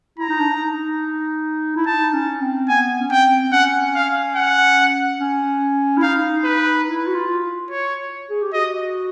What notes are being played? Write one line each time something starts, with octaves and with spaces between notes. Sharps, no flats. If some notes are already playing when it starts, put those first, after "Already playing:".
E4 A#5
D#4
D4
D#4
E4
D#4 A5
C#4
C4
B3 G#5
C#4
C4 G5
C#4 F#5
F5
F#5
C#4
E4
D#4 F5
B4
E4
F#4
F4
C#5
G#4
G4
F#4 D#5